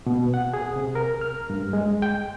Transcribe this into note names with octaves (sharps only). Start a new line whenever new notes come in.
B2
F#5
G#4
C3
A#4
F6
G2
G#3
G5